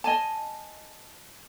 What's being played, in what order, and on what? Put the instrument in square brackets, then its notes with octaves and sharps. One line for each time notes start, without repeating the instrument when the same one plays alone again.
[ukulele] D#5 G#5 A5